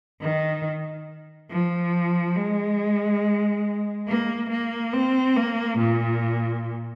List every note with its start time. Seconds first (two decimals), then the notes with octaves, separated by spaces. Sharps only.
0.22 D#3
1.51 F3
2.36 G#3
4.08 A#3
4.50 A#3
4.93 C4
5.36 A#3
5.79 A#2